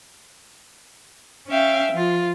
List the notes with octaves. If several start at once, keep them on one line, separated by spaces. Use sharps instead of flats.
C#4 E5 F5 G5
F3 F4